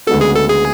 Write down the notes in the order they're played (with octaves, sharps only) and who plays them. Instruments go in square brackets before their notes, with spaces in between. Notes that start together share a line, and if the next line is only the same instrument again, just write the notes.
[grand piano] D2 C#3 G#3 B3 F#4 [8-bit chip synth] A4
[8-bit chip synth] G#4
A4
G#4